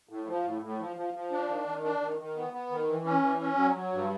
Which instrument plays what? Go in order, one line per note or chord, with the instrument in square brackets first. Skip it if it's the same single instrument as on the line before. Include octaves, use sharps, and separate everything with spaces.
[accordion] A2
F3
A2
A2
F3
F3
F3
D4
D#3
D#3
D4
D#3
D#3
B3
B3
D#3
E3
C#4
E3
C#4
F#3
F#3
G2